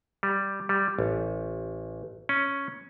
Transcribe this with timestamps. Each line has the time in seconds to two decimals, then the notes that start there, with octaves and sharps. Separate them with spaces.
0.23 G3
0.69 G3
0.99 A1
2.29 C#4